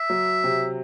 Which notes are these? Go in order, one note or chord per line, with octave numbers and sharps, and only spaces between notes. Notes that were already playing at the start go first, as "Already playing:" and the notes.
Already playing: E5
F#3
C3